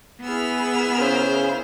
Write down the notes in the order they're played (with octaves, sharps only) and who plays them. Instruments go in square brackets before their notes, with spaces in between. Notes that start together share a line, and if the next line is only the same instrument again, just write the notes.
[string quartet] B3 E6 F6 [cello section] E4 G#4 B4
[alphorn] C#3 [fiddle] C5